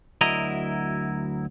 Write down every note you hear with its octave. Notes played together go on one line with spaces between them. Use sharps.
D2 F#3 E4 A#4 D#5 A#5